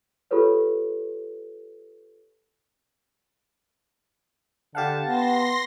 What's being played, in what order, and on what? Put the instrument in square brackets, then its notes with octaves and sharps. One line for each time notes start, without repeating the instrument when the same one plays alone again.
[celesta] F4 G4 A4 B4 C#5
[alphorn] D3 [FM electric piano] G4 F5 F#5 [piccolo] A5
[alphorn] B3 [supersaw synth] C6 A#6